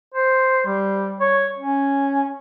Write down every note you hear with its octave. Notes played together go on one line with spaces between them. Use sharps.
C5
G3
C#5
C#4